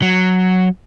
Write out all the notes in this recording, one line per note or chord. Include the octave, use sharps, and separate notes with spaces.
F#3